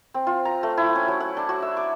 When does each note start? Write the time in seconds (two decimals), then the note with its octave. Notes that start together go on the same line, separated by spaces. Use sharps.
0.14 C4
0.27 F4
0.45 A#5
0.63 A3
0.77 E4
0.95 C#4
1.08 F#3
1.20 F#5
1.37 D4
1.49 F#4
1.62 E5
1.77 D6